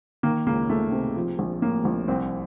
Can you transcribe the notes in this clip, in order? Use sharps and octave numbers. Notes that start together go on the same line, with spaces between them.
D#3 A#3
C#2 A#3
C#2 A3
C3
F3
A#1
A2 A#3
A#1
C2 C4